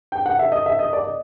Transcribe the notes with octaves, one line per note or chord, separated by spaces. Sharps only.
G5
F#5
E5
D#5
E5
D#5
D5
D#5